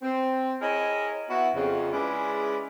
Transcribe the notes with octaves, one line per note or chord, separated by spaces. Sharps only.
C4
E4 G#4 A#4 C#5 D#5
B3 E4 F#4
F2 C#3
G#3 C#4 E4 G#4 B4 D5